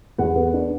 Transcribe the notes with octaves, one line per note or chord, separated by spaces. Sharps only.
E2 F#5
B3
D4